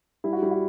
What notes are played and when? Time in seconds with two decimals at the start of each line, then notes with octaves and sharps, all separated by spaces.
0.24 G3 E4
0.33 F#4
0.42 G3 E4
0.51 F#4